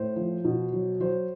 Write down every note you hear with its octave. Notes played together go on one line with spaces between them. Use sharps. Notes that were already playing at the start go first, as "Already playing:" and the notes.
Already playing: A2 C5
F3
B2
F#3
F#3 C5